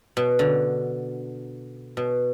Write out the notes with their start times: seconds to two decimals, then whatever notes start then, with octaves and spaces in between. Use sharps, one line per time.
0.17 B2
0.39 D3
1.97 B2